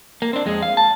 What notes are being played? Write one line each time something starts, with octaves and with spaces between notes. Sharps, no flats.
A#3
C4 D4
F2 G#3
F5
A5